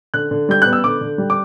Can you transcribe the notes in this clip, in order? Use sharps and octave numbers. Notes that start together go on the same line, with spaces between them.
D3 F#6
D3
G3 G6
B3 F#6
E6
D3 D6
D3
G3
D6